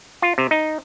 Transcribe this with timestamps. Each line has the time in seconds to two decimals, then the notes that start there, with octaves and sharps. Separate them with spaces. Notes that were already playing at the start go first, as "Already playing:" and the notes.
0.22 F4
0.38 C3
0.51 D#4